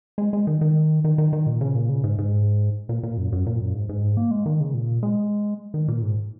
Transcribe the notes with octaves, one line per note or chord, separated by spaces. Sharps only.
G#3
G#3
D#3
D#3
D#3
D#3
D#3
A#2
C#3
A#2
C#3
G#2
G#2
A#2
A#2
F#2
F#2
A#2
F#2
G#2
G#2
A#3
G#3
D#3
C#3
A#2
G#3
D#3
A#2
G#2